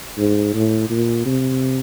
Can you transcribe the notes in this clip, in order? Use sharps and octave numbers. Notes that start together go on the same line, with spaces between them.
G#2
A2
A#2
C3